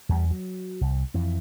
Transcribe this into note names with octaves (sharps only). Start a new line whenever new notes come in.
E2 G3
F#3
C2
F2 E3